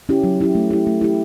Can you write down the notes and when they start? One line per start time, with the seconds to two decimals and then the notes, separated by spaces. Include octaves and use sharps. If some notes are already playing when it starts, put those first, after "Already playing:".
0.09 C#4 E4 G4
0.24 F#3
0.40 C#4 E4 G4
0.55 A3
0.70 E4 G4
0.87 A3
1.01 E4 G4